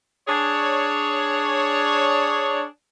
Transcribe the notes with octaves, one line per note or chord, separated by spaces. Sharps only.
D4 G#4 C#5